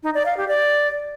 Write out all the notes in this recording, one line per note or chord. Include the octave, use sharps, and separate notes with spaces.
D#4
D5
F5
G4
D5